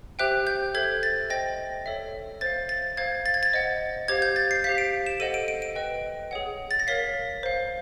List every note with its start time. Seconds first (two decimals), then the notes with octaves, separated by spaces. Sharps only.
0.19 G4 C5 E5 G5 F#6
0.47 G6
0.75 A4 C5 E5 G#6
1.03 A6
1.30 C5 D#5 G5 A#6
1.86 A4 C#5 E5
2.41 C5 F5 A6
2.69 A6
2.97 C5 F5 G#6
3.26 A6
3.34 G#6
3.43 A6
3.53 C5 D#5 F#5
4.08 G4 C5 F5 G#6
4.22 G6
4.36 A6
4.51 C7
4.64 G4 C5 F5 B6
4.78 D7
5.06 E7
5.20 A4 C5 D#5 F#5 D#7
5.34 D7
5.48 D7
5.62 D7
5.75 B4 D#5 G5
6.31 G#4 C#5 F#5
6.71 A6
6.80 A#6
6.87 A#4 C#5 F5 B6
7.43 C5 F5